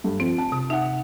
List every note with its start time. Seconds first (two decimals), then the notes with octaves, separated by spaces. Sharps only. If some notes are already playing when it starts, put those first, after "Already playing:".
0.04 G2 A3
0.20 F3 C4
0.38 A5
0.52 C3
0.70 D#4 E5 F#5